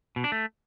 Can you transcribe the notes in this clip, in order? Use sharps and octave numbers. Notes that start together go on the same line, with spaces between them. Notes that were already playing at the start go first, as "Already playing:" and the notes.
B2
D4
A3